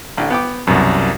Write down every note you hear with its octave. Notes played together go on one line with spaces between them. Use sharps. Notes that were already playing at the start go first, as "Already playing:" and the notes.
A1 D3 G5
B3 G5 D6
C2 F#2 B2